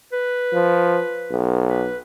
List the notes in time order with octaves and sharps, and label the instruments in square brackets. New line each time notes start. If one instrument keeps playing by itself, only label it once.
[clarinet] B4
[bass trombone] F3
B1
[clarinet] B4